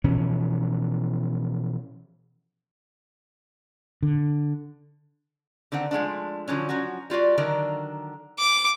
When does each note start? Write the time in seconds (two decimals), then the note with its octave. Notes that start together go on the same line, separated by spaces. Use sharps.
0.04 B2 E3 F3 C#4
4.03 D3
5.72 D3 D#3 C4 F#5
5.91 F3 G#3 A3 D4
6.48 D3 F3 F#3 C#4
6.69 F3 F#3 C#4 F#4
7.10 G3 F4 F#4 D5
7.38 D3 D#3 F#3 D4 A#4
8.39 D6